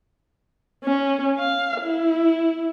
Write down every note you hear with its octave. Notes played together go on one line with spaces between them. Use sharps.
C#4
F5
E4